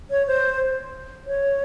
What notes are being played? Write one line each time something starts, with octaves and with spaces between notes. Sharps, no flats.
C#5
C5
C#5